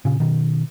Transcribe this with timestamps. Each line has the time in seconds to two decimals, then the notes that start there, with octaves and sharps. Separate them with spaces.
0.05 A#2 C#3
0.20 B2 D#3